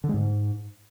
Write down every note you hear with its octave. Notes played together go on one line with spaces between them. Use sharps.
D3
G#3
G#2